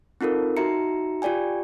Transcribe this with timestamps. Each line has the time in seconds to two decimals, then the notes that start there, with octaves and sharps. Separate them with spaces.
0.21 C4 D#4 F4 A4 A#4
0.57 D#4 F#4 E5 A#5 C#7
1.22 F4 G4 D5 G5 G#5